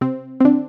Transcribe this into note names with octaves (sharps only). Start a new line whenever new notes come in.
C3 C4
C4
D3 D4